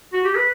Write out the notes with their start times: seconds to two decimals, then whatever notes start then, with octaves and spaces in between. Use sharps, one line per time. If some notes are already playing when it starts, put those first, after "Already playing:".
0.13 F#4
0.24 G4
0.36 B4